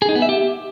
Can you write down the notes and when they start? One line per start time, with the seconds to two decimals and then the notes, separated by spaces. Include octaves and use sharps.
0.02 G#4
0.09 D#4
0.15 B3
0.22 E5
0.29 G4